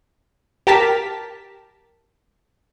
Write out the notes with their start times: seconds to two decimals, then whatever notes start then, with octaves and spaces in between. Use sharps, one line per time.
0.67 G4 A#4 A5 B6